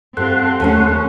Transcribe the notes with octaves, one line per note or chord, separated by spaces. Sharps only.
G2 C4 F4 A4 F#5 C6
D#2 D3 A3 C#4